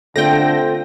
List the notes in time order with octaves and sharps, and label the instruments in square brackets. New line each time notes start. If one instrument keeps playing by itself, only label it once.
[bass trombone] D3 [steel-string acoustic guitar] A3 C4 F4 [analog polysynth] G5 A#6